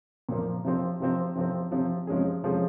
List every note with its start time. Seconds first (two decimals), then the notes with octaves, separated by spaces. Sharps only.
0.29 A#2 F3 A#3
0.64 C3 F3 C4
1.00 C3 F3 C4
1.36 C3 F3 C4
1.72 C3 F3 C4
2.07 C3 F3 G#3 C#4 G#4
2.43 C3 F3 G#3 C#4 G#4